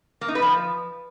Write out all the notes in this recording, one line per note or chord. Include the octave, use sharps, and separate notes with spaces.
A#3
D#4
B4
F3